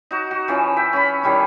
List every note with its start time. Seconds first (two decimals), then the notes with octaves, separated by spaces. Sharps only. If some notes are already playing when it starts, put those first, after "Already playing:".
0.11 D#4 F#4
0.31 F#4
0.48 E3 F3 C#4
0.77 E5 G5
0.93 C#4 B5
1.23 D#3 G3 C#4 E4